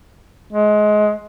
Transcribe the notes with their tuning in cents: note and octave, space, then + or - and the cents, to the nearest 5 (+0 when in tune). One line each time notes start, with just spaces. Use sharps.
G#3 +20